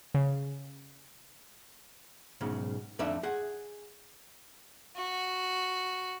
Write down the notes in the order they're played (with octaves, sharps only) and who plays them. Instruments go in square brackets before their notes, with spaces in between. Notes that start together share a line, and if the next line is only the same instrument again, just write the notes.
[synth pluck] C#3
[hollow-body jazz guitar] B1 G#2 C#3
F2 A3 D4 D#4 E5
G#4 F#5
[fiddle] F#4